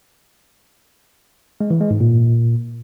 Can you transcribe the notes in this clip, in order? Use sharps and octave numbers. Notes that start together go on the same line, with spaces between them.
G#3
E3
G#3
G#2
A#2